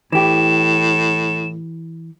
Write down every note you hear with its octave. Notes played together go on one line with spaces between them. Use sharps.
A2 E3 G4 E7